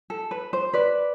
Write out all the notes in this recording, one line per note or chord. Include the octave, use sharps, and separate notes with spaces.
A4
B4
C5
B4 D5